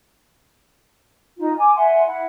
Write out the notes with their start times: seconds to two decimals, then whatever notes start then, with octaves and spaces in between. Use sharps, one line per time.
1.38 D#4 F4
1.57 G#5 D6
1.75 E5 F#5 G#5 C6
2.06 E4 F#5